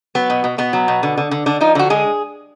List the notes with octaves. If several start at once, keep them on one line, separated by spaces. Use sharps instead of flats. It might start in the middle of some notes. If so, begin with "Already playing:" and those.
F#3 B3
B2
B2
B2 B3
F#3
B2
D3
D3
D3
D3 D4
F3 D#4
D3 F#4
G#3 G#4